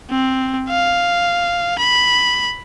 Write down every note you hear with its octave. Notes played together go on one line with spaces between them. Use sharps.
C4
F5
B5